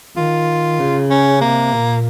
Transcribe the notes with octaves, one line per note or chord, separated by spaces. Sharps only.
D#3 F4
C#3
C#4
C3 A#3
A#2